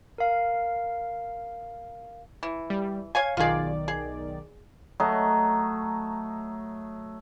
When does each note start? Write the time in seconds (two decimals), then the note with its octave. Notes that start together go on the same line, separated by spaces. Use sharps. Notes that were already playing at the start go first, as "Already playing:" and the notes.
0.18 A#4 F5
2.43 E3
2.70 G3
3.15 C#5 F5 G#5 G#6
3.37 B1 D#3 F4 G#4 D5
3.88 G#4
5.00 F#3 A3 D#5